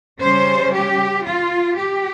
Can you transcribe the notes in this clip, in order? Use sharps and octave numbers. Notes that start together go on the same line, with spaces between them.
C#3 G3 C#4 C5
G4
F4
G4